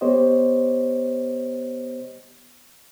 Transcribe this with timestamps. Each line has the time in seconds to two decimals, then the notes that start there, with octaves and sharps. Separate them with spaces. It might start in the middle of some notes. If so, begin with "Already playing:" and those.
0.01 B3 G4 C5 C#5 D#5